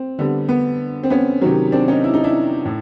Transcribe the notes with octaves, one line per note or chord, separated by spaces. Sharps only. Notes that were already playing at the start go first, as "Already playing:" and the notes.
Already playing: C4
D3 G3 B3
B3
C4
B3 C#4
C3 D#3 F#3
C4 D4
C#4 D#4
E4
D#4
D4 E4
A2